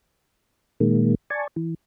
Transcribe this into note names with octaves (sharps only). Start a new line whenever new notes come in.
A#2 D#3 G#3 A#3
D5 G#5 A5 C#6
E3